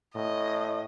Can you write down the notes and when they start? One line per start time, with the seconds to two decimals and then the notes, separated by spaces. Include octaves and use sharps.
0.15 A2 D#5